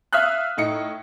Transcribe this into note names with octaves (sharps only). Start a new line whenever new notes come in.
E5 F5 D#6 F6 F#6
A2 D#4 C#7